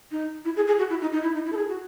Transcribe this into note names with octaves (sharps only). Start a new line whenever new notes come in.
D#4
E4
G#4
G#4
F#4
E4
D#4
D#4
E4
D#4
E4
A4
G#4
F#4